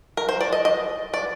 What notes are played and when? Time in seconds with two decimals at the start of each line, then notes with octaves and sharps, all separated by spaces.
0.17 A#4
0.29 C5
0.41 D5
0.52 D#5
0.65 D#5
1.14 D5